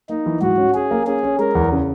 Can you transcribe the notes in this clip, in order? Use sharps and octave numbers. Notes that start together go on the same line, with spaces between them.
A#3 D#4
E3
G#2 F#4
C#4
C#4 G#4
A#3
C#4 G#4
C#4
G#3 A#4
E2
C#3